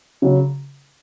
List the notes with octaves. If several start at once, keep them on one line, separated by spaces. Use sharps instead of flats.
C#3 F#3 C#4